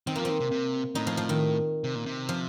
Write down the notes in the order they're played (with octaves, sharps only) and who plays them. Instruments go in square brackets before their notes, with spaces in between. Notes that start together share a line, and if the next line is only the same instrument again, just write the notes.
[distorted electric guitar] D#3 [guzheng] C4
[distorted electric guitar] F3 [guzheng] A#3
[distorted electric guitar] D#3 [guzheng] C4
[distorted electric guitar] C3
C3
[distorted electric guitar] A2 [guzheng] D#4
[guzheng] F3
F3
D#3
[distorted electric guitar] C3
A#2
C3
[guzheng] F3